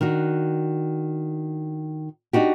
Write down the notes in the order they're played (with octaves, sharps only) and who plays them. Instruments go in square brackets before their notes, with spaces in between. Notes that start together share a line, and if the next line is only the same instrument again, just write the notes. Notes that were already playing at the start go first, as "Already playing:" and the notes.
[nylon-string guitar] D#3 D4 F#4
D4 D#4 F#4 G4